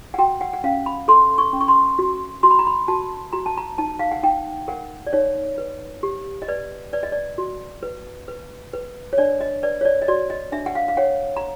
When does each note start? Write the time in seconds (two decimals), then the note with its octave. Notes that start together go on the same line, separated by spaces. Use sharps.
0.14 F#5
0.18 F#4 G5
0.41 F#5
0.53 F#5
0.64 C#4 F5
0.86 B5
1.08 A4 C6
1.38 C#6
1.53 C#4
1.61 C#6
1.68 C6
1.99 F#4
2.43 F#4 C6
2.51 B5
2.59 A#5
2.67 B5
2.88 F#4 A5
3.33 F#4 A#5
3.46 A5
3.57 A#5
3.78 D#4 A5
3.99 F5
4.11 F#5
4.23 D#4 G5
4.68 A#4 F#5
5.07 D5
5.13 D#4 C#5
5.58 B4
6.03 G4
6.42 D#5
6.48 B4 D5
6.93 B4 D5
7.03 D#5
7.12 D5
7.38 F#4
7.83 B4
8.28 B4
8.73 B4
9.13 C#5
9.18 D4 D5
9.41 D#5
9.63 B4 D5
9.81 C#5
9.85 D5
10.02 D#5
10.08 F#4 D5
10.30 D#5
10.52 D4 E5
10.66 F#5
10.75 F5
10.88 F5
10.97 C#5 F#5
11.37 A#5